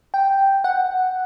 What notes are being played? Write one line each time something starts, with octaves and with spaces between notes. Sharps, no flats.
G5
F#5